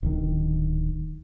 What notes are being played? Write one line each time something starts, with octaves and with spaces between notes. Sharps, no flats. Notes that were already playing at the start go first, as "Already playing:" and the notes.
D1 D#3